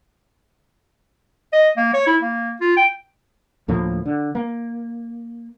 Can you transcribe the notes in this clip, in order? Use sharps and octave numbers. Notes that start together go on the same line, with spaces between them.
D#5
A#3
C#5
E4
A#3
F4
G5
D2 A2 F3 A#3
D3
A#3